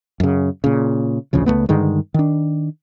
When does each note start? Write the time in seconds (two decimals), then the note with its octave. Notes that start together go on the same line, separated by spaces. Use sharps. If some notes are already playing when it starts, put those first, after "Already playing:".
0.20 F#2 C#3
0.64 A#2 C#3
1.33 A1 D2 C#3 F3
1.46 C#2 G#2 A3 B3
1.69 G2 D3 D#3 G#3
2.14 D#3 D4